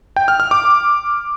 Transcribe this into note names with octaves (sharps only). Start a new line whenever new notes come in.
G5
F6
F6
D6